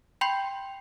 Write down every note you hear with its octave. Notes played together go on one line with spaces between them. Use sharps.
G5 B5 C6 G6 C7